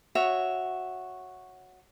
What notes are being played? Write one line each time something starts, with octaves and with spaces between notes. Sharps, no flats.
F#4 C#5 E5